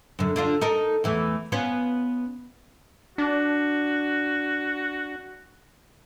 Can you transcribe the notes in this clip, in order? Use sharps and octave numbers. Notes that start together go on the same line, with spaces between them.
F#2 D3
D3 D4 F4
D#4 A4 A#4
E2 E3 A3
B3 C#4 F4
D4 F#4